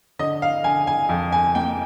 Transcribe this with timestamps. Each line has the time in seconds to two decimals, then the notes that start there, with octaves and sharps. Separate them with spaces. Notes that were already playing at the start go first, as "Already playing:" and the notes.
0.19 D3 D#5
0.42 F5
0.64 D3 G#5
0.87 G#5
1.09 F2
1.32 G#5
1.55 A#3 G5